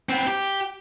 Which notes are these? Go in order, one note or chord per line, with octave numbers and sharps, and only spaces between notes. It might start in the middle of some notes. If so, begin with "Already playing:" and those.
B3 C4
G4